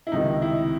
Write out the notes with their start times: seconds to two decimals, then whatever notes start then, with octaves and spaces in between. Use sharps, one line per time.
0.07 E4
0.12 C#2 C3 D#3 D#4
0.42 E4